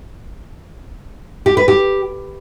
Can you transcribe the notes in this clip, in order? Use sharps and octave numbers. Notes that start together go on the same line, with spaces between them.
G4
B4
G4